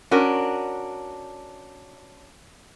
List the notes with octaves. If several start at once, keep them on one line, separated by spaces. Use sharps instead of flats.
C#4 D4 F#4 A#4